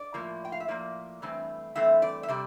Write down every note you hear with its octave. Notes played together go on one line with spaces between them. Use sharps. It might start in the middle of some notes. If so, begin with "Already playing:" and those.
Already playing: D5
A2 F3 A#3
G5
F5
E5
A2 F3 A#3 D5
G2 E3 A3 C4
G2 E3 A3 C4 E5
D5
E5
C3 G3 D5